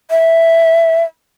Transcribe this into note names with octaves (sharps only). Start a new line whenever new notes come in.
E5